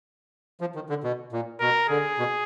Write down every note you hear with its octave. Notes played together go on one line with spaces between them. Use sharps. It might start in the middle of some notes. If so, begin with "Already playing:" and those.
F3
D#3
D3
B2
A#2
B2 A#4
D3 G#4
B2